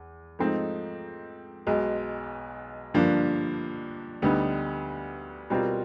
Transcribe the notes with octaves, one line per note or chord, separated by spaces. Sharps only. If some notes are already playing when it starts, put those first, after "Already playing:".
Already playing: E2
G#2 F3 A3 C4 D#4
B1 B2 G#3
G2 D3 F3 A#3 D4
D2 D3 G3 B3 D#4
B2 G3 C4 F4 A#4